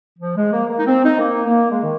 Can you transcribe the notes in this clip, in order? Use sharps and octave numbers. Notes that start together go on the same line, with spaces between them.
F3
G#3
A#3
A#3
D#4
C4
D#4
A#3
A#3
G#3
D#3